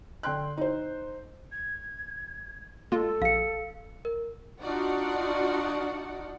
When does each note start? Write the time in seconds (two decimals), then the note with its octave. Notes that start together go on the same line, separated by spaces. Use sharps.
0.23 D3 G5 C6 F#6
0.57 D#4 C5
1.52 G#6
2.92 G#3 A#3 F4 A4
3.22 A#1 F5 C#7
4.05 A#4
4.61 D4 D#4 F4 F#4 D5 F#5